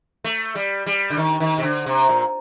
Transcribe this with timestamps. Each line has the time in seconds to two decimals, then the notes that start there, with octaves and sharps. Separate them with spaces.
0.24 A3
0.55 G3
0.86 G3
1.10 D3
1.17 D#3
1.40 D#3
1.58 C3
1.63 D3
1.86 C3
2.09 A#2